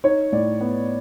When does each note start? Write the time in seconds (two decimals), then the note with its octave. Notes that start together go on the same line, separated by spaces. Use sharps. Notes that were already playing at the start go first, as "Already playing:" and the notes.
0.04 D#4 C#5
0.32 A2 D5
0.61 B3